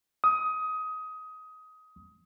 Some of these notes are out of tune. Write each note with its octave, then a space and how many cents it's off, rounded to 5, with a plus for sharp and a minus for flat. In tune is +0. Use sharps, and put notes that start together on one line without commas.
D#6 +20